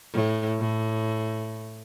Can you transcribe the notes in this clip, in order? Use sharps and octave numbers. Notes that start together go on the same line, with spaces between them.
A2
A2